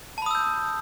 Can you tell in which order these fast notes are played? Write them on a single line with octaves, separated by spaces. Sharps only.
A5 B5 D#6 E6 G6